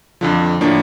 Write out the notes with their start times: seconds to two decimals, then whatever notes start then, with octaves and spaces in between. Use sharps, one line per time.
0.21 F2 D3 F3
0.61 A2 F3 A#3 D4